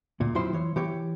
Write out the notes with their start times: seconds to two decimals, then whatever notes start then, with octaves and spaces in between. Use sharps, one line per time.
0.20 D2 A#2
0.35 F2 F3 F#3 E4 C5 C6
0.53 E3 C#5
0.76 E3 G4 C#5